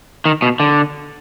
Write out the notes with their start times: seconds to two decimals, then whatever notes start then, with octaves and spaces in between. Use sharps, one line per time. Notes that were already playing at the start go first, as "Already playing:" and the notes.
0.25 D#3
0.42 B2
0.60 D3